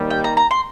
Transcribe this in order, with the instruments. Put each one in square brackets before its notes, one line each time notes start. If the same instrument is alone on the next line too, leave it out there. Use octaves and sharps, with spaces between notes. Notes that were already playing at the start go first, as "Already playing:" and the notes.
Already playing: [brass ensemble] D#2 D#3 G3
[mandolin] G5
A#5
A#5
C6